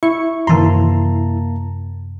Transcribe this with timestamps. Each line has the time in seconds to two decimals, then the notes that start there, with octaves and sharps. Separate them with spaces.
0.03 E4 C#6
0.47 F#2 C3 D#3 E3 A#3 A5 A#5 C6